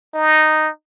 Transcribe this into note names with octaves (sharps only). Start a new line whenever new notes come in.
D#4